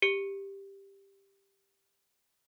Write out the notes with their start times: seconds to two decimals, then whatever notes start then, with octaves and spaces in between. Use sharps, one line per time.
0.02 G4 C#7 G7